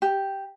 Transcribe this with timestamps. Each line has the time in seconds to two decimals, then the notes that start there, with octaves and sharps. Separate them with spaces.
0.02 G4